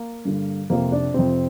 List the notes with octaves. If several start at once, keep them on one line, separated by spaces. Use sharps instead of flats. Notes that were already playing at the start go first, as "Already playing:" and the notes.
Already playing: A#3
G2 D3
F2 C3 A#3
D4
F2 C3 C4